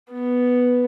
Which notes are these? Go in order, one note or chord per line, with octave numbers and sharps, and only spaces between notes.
B3